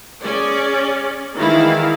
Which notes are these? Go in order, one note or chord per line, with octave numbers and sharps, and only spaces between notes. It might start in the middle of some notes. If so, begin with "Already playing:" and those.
C#4 G#4 D5
D#3 E3 G#3 E4 F5